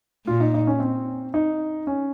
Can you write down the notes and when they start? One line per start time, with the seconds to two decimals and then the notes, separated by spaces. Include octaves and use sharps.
0.27 A#2 F4
0.40 D#4
0.54 D#4
0.67 C#4
0.80 C4
1.34 D#4
1.87 C#4